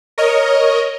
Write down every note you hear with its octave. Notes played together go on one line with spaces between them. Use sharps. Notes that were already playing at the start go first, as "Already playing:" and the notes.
A#4 C#5 D#5